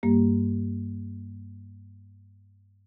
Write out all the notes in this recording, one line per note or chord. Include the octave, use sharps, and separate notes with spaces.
G2 G3 A#3 G4